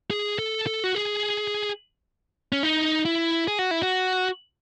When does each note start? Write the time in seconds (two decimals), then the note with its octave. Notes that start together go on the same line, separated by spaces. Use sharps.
0.11 G#4
0.39 A4
0.67 A4
0.84 F#4
0.95 G#4
2.52 C#4
2.63 D#4
3.05 E4
3.48 G#4
3.59 F#4
3.71 E4
3.83 F#4